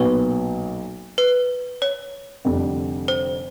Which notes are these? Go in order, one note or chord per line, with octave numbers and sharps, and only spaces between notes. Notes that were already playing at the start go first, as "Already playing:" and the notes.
Already playing: B1 A#2 F#3 B3 B4
B4
C#5
F1 F2 D3 G3
C5